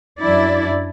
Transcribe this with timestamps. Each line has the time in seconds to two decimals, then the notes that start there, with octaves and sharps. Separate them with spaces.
0.18 F#2 D4 E4 D5